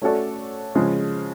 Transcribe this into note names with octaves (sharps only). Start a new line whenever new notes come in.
A3 C#4 F#4 A4 D5
C#3 F3 G#3